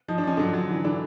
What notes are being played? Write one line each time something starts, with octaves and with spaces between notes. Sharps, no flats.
F3 D#4
D4
F3 C#4
D3 F#3 D4
F#3
E3
D3 E3 D4